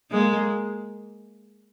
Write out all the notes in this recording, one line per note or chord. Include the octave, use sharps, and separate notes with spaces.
G#3 A#3